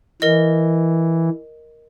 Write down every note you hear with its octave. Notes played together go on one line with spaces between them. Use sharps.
E3 A#4 D#5